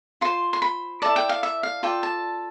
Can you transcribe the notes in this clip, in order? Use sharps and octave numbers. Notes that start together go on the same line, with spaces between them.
F4 C5 C6
C6
B5
E4 A4 D5 A5
G5
F5
E5
F5
F4 A4 D5 G5
A5